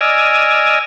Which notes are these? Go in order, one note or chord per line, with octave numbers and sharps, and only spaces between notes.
D5 D#5 G#5 E6 F6